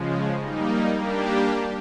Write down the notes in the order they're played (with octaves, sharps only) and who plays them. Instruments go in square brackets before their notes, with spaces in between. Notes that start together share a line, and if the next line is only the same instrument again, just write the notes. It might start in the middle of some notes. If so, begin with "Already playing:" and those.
Already playing: [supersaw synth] C#3 F3 G#3
G3 A#3 D#4
G3 A#3 D4 G4